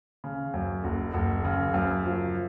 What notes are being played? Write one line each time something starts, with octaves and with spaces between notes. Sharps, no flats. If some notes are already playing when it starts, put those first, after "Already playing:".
C#3
F#2
F#1
F#1
C#3
F#2
F3